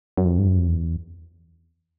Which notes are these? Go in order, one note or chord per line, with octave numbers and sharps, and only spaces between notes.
F#2
F2
G2
F#2
F2
E2